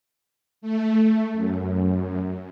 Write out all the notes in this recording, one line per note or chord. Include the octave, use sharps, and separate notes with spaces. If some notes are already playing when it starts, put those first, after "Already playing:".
A3
F#2